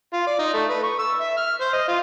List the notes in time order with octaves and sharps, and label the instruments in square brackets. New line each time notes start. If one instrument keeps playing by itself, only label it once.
[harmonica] F4
D5
D#4
A3
B4
C#6
E6
E5
F6
C5
D#5
F4